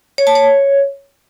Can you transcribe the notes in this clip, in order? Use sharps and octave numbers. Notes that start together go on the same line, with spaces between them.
C#5
A5
C#5